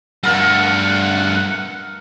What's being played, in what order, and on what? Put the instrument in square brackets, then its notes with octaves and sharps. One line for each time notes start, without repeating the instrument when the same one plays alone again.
[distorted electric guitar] G2 A3 [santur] A4 A#4 F5 [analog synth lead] F#5